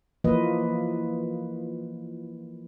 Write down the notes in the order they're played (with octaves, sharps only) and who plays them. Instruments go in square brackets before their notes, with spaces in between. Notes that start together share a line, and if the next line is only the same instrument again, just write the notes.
[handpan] E3 F3 A#3 F4 B4 D#5